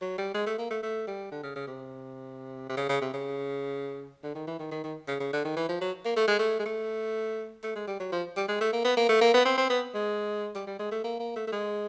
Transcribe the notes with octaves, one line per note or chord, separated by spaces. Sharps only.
F#3
G3
G#3
A3
A#3
A3
A3
G3
D3
C#3
C#3
C3
C3
C#3
C#3
C3
C#3
D3
D#3
E3
D#3
D#3
D#3
C#3
C#3
D3
D#3
E3
F3
F#3
A#3
A3
G#3
A3
G#3
A3
A3
G#3
G3
F#3
F3
G3
G#3
A3
A#3
B3
A#3
A3
A#3
B3
C4
C4
B3
G#3
G3
G3
G#3
A3
A#3
A#3
A3
A3
G#3